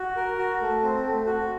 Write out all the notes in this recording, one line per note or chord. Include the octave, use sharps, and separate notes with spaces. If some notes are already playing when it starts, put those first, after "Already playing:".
Already playing: F#4
A#4
F#4
A3
C4
A3
F#4